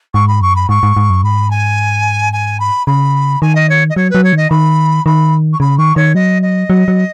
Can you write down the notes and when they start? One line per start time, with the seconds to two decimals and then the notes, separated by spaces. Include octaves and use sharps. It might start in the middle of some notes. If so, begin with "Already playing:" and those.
0.14 G#2 C#6
0.28 B5
0.41 F#2 C#6
0.56 B5
0.69 G#2 C#6
0.83 G#2
0.97 G#2
1.10 F#2
1.23 G#2 B5
1.50 G#5
2.33 G#5
2.60 B5
2.87 C#3 B5
3.42 D#3 G#5
3.55 D#5
3.69 C#5
3.90 D#5
3.96 F#3 C#5
4.10 F#3 B4
4.24 C#5
4.33 D#3 D#5
4.50 D#3 B5
5.06 D#3 B5
5.53 C#6
5.60 C#3 B5
5.78 D#3 C#6
5.96 D#3 C#5
6.15 F#3 D#5
6.42 D#5
6.70 F#3
6.88 F#3